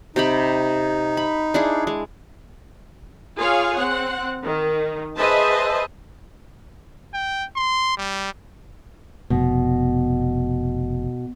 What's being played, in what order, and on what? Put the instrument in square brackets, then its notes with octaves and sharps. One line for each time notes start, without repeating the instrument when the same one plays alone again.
[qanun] C3 G4 B5 [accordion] D#4
[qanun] B5
D4 E4 G#4
G#3
[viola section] F4 G#4 C#5 F5
C4 F#5
D#3
G#4 B4 C5 D#5 E5 A5
[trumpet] G5
C6
G3
[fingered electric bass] F1 [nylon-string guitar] B2